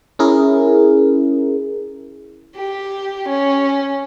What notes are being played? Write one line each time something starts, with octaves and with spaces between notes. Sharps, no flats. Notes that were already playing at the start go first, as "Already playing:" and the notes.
C#4 E4 G#4 A#4
G4
C#4